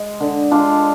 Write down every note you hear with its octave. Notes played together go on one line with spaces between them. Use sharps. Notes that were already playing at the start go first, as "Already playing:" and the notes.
Already playing: G#3
D3
G#3 D4 F4